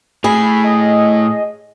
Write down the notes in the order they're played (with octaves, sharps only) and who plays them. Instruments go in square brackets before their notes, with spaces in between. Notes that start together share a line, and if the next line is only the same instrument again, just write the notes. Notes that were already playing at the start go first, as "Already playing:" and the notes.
[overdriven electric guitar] A2 [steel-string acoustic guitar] G#4 [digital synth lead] B5
[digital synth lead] D#5